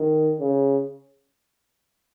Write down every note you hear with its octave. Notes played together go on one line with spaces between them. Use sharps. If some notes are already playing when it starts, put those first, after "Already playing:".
Already playing: D#3
C#3